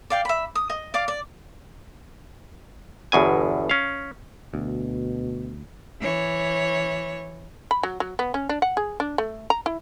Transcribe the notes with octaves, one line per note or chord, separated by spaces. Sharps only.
D5 F5 G5
E5 B5
D#6
D#5
D5 F5 D6
D5
G1 E2 B2 G#5
C#4 F5
D2 B2
E3 C#5
B5
F#3
F#3
B3
C#4
D4
F#5
G#4
D4
A3
A#5
E4